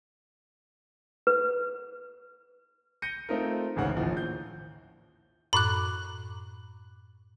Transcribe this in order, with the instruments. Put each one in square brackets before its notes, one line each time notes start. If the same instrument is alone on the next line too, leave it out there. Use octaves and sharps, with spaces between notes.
[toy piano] B4
[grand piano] G6 A#6 C#7 D#7
A3 C4 D#4 F4 A#4
A1 D2 G#2 C#3 F#5
A#1 D#2 A2 F3
G6
[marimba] F#2 A2 D6 [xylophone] B5 F#6